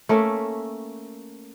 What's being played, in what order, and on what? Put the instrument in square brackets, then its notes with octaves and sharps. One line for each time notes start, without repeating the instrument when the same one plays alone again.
[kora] A3 A#3 C#4 E5